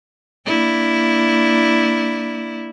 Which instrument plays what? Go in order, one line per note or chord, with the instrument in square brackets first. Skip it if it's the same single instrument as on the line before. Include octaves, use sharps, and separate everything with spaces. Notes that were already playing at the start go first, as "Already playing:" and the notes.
[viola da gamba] A#3 D4 E4